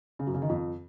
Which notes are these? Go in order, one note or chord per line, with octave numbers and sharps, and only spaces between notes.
C#3
F#2
C#3
D#3
F2